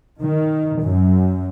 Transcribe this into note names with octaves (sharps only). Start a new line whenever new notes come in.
D#3
F#2